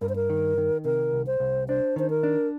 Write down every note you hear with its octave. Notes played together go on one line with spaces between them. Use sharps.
G2 A#4
C5
A#4
D#3
D#3
C3 A#4
C2
C5
C2
D4 C5
D#3 C5
A#4
D4